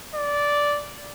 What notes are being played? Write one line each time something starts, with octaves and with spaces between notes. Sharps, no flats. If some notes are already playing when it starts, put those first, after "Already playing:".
D5